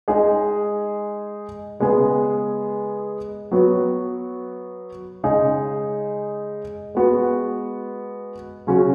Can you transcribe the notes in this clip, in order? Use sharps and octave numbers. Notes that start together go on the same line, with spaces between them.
G#3 D#4 G#4
C#3 G#3 B3 G#4
F#3 B3 F#4
C#3 G#3 D#4 G#4
G#3 B3 F#4
C#3 F#3 C#4 F#4